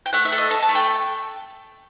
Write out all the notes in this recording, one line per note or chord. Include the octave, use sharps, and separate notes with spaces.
G5
A3 F#5
E5
A4
D#5
A4 A5
A5
A3
G5